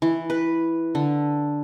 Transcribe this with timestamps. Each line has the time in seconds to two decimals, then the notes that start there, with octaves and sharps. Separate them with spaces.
0.02 E3
0.30 B4
0.95 D3